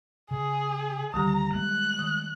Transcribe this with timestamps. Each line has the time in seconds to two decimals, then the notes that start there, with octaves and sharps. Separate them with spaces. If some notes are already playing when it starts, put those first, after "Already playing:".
0.31 C#3 G#4
1.14 D2 D#3 G3 G4 A#5
1.55 G#3 A3 B3 F#6
1.99 D#3